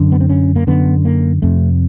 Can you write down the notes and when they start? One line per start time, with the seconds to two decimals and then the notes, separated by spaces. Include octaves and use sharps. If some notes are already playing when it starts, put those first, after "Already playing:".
Already playing: F#2 D3
0.12 B3
0.20 C4
0.29 C#4
0.56 A#3
0.67 F#2 D3 B3
1.05 A#3
1.42 F2 C3 A3